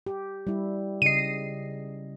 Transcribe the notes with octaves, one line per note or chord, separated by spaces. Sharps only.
G4
G3 E4
C#3 D#5 C7 D#7